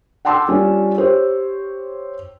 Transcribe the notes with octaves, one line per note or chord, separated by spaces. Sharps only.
F#5 G5 A5 C6 D6 E6
G3 C#4 D4 F4
G4 C5 C#5